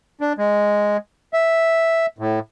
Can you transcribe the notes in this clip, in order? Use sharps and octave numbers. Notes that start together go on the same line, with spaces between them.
D4
G#3
E5
A2